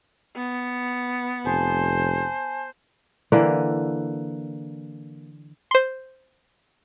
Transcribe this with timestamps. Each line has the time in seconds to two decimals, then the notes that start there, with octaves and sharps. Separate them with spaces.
0.36 B3
1.45 F1 C5 G#5 A5
3.32 D3 E3 A#3
5.71 C5 C6